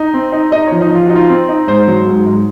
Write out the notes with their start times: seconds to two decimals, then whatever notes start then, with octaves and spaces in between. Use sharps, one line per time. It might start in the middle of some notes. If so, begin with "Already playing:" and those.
Already playing: D#4
0.14 C4
0.33 D#4
0.52 D#4 D#5
0.67 C#5
0.71 F3
0.81 D#4
0.90 F3 F4
1.06 D#4 F#4
1.16 F4
1.29 C4
1.49 D#4
1.67 G#2 C5
1.87 F#3
2.07 G#2
2.26 G#2